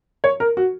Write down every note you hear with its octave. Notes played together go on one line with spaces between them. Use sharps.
C#5
A#4
F#4